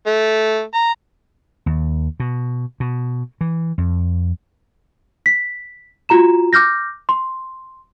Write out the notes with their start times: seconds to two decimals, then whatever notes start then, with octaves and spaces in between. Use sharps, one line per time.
0.07 A3
0.74 A#5
1.66 D#2
2.20 B2
2.80 B2
3.41 E3
3.78 F2
5.26 B6
6.09 F4 F#4 A#5 E7
6.53 D6 F6 G6 A#6
7.09 C6